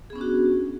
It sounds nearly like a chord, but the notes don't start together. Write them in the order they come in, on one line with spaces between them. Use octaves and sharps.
G#4 B3 C#4 D4 F#4